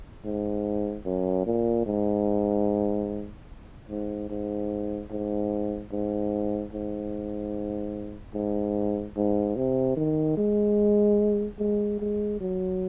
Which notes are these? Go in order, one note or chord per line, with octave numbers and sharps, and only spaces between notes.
G#2
F#2
A#2
G#2
G#2
G#2
G#2
G#2
G#2
G#2
G#2
C3
D#3
G#3
G#3
G#3
F#3